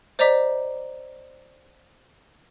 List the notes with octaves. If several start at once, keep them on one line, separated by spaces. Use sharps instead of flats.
C5 D5 D#5 A#5 D6 B6